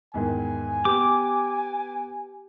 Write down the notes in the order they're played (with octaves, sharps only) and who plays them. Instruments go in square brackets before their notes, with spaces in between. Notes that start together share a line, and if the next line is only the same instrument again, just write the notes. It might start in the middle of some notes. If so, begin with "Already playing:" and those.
[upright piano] E2 G#2 D#3 [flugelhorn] G#5
[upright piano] B3 [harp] G4 [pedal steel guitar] D6